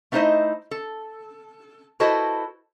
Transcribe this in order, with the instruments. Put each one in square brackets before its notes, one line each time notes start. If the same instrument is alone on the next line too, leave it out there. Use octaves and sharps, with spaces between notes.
[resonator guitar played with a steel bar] A3 B3 D#4 E4 C5 D#5
A4
E4 F#4 A4 B4 C5 D#5